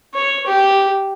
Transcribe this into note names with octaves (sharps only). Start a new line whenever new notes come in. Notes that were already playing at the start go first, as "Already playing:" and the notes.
C#5
G4